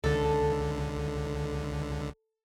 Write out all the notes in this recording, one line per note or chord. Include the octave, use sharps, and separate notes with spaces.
C#2 D3 A4